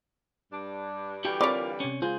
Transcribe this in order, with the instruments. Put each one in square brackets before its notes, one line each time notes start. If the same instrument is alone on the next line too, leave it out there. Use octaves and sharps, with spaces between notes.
[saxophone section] G2 D4
[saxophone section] D3 E3 G3 [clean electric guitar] F#4 G4 G5
[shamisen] C4 C#5 [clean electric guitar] F4 A#4 [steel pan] D5 B5 D6
[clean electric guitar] C3 C#4
[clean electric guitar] C#2 G#4 C5 [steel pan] F4